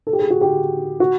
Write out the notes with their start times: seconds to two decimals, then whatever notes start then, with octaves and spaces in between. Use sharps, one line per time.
0.07 A4
0.13 G4
0.19 G#4
0.30 F#4
0.41 G4
1.00 F#4